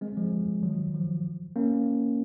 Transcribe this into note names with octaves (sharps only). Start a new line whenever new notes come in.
G#3 C4
F3 G#3
D#3 F#3
F3
A#3 C#4